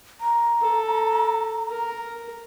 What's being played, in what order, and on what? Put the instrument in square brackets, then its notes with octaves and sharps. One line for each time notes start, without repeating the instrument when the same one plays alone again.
[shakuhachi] A#5
[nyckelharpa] A4
A#4